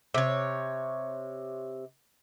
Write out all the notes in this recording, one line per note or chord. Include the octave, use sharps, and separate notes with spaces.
C3 C#5